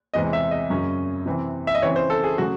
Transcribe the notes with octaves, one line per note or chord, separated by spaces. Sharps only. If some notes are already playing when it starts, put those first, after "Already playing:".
E2 C3 E3 G#3 C4 D#5
E5
D#5
F#2 C#3 F#3 C#4
C3 E3 C4
E5
D#5
C#3 E3 C4 C#5
C5
A4
G#4
C#3 F#3 A3 F#4